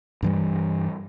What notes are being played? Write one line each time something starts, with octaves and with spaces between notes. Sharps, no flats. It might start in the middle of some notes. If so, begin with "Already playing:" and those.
G2 E3 G3